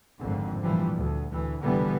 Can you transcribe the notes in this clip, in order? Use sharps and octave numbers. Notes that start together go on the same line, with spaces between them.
G#1 F2 A2 D3
A#2 E3 F3 G3
D2
D2 E3
F1 B2 D3 E3 G3 B3